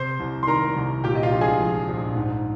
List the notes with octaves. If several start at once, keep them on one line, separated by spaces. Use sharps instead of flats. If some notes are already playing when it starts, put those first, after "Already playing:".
Already playing: C3 C5 C6
C2
C6
D#3 A#4 A#5
C2
A#2 G4 G5
D#5
F4 F5
A#1
G#4 G#5
F3
A#1
G#2